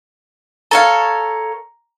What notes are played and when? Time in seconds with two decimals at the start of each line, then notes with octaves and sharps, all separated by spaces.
0.71 A4 C#5 F5 A#5